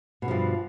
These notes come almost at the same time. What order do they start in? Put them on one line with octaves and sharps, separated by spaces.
B2 D3 F3 G2